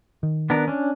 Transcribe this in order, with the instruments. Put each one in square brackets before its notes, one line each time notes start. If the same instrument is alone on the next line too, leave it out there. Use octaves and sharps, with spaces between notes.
[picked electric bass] D#3
[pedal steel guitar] B3 D4 A#4
C#4 D4